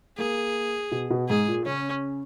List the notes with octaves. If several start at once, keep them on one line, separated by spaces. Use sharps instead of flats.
A#3 G#4
B2
B2
G#2 G#4
A#2
C#3 C#4